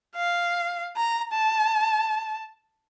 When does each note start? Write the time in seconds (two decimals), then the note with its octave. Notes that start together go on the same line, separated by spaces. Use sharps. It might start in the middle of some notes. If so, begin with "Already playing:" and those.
0.16 F5
0.97 A#5
1.33 A5